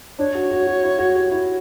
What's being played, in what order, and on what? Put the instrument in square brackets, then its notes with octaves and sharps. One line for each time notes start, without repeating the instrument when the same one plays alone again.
[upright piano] D4 [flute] C#5
[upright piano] F#4
F#4
F#4
E4
F#4
G4
E4